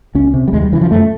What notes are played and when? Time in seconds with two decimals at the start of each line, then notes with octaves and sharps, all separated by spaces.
0.15 C#2 C#4
0.34 C3
0.48 G3
0.53 D#2 G#3
0.62 G3
0.72 C#3 E3
0.81 F3
0.91 F#2 A3